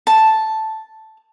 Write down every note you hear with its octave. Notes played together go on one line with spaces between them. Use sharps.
A5